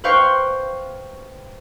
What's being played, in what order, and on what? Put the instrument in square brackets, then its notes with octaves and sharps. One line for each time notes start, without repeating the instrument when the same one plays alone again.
[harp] B4 C5 F5 G5 C#6